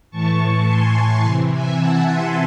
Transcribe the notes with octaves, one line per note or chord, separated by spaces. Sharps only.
A2 E3 A5 C#6
G#5 C6
C3 E3 G#5 C6
E5 G#5
F#5 A5
G#5 C6